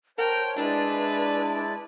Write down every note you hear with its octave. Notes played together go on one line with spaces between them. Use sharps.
A#4 C5 C#5 G5 A5
G#3 D4 E4 B4 D5